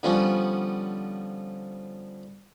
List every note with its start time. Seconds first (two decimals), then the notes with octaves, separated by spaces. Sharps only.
0.03 D3 F3 G3 B3 C#4